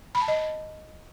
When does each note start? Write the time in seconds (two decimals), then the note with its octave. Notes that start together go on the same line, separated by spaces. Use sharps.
0.15 B5
0.21 A5
0.28 D#5